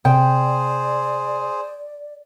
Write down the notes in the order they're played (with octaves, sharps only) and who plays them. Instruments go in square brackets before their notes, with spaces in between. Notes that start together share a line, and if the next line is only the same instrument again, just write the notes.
[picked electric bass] C3 [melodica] G#4 C5 [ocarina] D5 [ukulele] G5